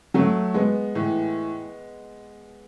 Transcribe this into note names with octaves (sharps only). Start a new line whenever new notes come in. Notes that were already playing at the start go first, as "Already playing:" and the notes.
F#3 A3
G#3 B3
A2 E3